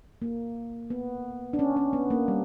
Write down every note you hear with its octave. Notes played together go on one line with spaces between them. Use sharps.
A#3
B3
D4
C#4
C#4
B3
A#3
G3